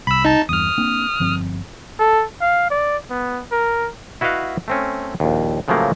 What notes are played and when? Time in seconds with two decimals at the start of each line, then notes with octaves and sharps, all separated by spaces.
0.07 C2 B5 E6
0.25 D#4 A5
0.49 E2 G2 D#6 F6
0.78 A#3 C4 D4
1.20 G1 F3 C4
1.99 A4
2.41 F5
2.70 D5
3.10 B3
3.52 A#4
4.21 E4 F#4 B4 D#5 F5 F#5
4.68 A3 C4 C#4
5.20 A#1 D#2
5.68 A2 C#3 F3 F#3 A3 A#3